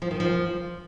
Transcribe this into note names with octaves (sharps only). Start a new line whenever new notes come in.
F3
D#3
F3